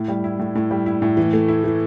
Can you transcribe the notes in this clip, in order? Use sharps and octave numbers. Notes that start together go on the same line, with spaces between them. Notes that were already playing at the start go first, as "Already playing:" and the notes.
Already playing: A2
G3
E4
A2
A2
G3
E4
A2
E3
A3
E4
E3